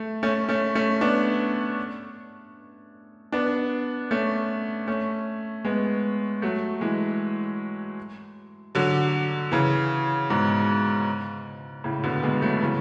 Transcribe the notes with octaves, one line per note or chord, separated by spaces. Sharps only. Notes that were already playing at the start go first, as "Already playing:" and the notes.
Already playing: A3
A3 C#4
A3 C#4
A3 C#4
B3 D4
B3 D4
A3 C#4
A3 C#4
G#3 B3
F#3 A3
E3 G#3
D3 F#3
C#3 E3
G#2 B2
A2 C#3
B2 D3
G#3 B3
F#3 A3
C#3 E3